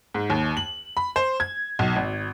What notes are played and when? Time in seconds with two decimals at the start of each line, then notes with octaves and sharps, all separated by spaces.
0.14 G#2
0.30 D#2
0.57 F#7
0.97 B5
1.16 C5
1.40 G#6
1.79 B1
1.96 G#1